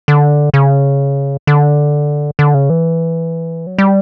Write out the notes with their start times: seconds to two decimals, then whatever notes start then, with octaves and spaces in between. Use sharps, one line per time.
0.08 D3
0.54 C#3
1.47 D3
2.39 D3
2.54 C#3
2.70 E3
3.67 F#3
3.78 G3